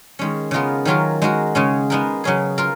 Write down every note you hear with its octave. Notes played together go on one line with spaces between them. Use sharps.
D#3 G#3 C#4
C#3 G#3 B3 F4 A#4
D#3 F#3 C#4 F4 A#4
G#3 D#4 F#4 A#4
C#3 G#3 C#4
G#3 B3 D#4 A#4
C#3 F#3 C#4 G#4
F4 A#4